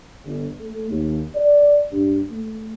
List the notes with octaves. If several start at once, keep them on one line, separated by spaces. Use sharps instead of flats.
G1
A3
D#2
D5
G2
A3